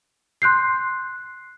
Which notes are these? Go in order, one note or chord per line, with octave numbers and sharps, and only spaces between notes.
C6 F#6 G6 C7